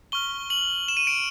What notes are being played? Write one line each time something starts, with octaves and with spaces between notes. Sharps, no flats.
C#6 F6 G7
F#7
E7
D#7
D7